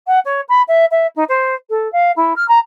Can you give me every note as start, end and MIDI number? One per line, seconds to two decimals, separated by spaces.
0.07 0.19 78
0.25 0.41 73
0.49 0.62 83
0.68 0.85 76
0.91 1.07 76
1.16 1.24 63
1.29 1.54 72
1.70 1.90 69
1.92 2.11 77
2.16 2.33 64
2.36 2.47 89
2.48 2.58 82